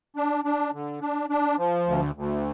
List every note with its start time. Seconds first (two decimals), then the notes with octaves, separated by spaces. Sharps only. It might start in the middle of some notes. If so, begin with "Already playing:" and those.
0.16 D4
0.45 D4
0.73 D3
1.01 D4
1.30 D4
1.58 F3
1.86 D2
2.15 D2